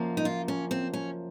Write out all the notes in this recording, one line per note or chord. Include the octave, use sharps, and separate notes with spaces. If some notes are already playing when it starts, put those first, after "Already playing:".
Already playing: F#2 C#3 F3 A#3
D#4
F4
C#4
C4
C#4